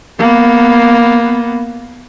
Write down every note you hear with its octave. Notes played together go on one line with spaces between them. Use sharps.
A#3 B3